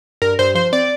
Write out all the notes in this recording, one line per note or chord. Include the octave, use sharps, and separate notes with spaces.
G2 A#4
G2 C5
F3 C5
C4 D5